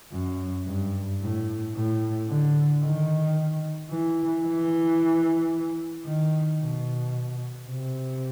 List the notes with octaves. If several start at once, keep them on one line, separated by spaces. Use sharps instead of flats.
F#2
G2
A2
A2
D3
D#3
E3
E3
D#3
B2
C3